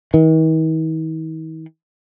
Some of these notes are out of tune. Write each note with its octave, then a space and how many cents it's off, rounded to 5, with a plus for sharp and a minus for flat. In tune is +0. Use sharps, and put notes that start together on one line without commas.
D#3 +45